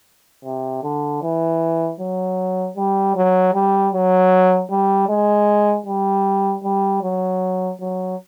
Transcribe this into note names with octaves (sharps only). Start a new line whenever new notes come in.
C3
D3
E3
F#3
G3
F#3
G3
F#3
G3
G#3
G3
G3
F#3
F#3